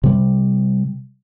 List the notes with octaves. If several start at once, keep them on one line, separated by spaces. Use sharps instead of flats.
C3 G3